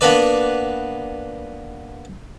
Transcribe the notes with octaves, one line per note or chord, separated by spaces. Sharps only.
A#3 B3 D4 B4 D5